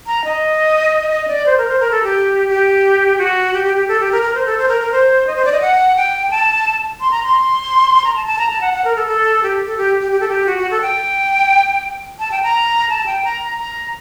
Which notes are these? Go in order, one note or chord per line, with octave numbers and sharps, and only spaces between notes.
A#5
D#5
D#5
D5
C5
A#4
C5
A#4
A4
G4
G4
F#4
G4
G4
G4
A4
G4
A#4
A#4
C5
A4
C5
A#4
A#4
C5
D#5
C5
D5
D#5
F#5
G5
A5
C6
A#5
C6
A#5
A5
A5
A#5
A5
F#5
F#5
A#4
A4
A4
G4
A4
G4
G4
G4
A4
G4
F#4
F#4
A4
G5
A5
G5
A#5
A5
G5
A#5
A#5